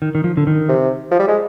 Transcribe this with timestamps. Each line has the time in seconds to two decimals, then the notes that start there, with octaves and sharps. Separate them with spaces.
0.02 D#3
0.15 D#3
0.24 F3
0.37 D3
0.47 D#3
0.69 C3
1.11 F3
1.20 G3
1.28 G#3